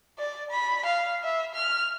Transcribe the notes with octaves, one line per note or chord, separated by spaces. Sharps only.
D5
B5
F5
E5
F6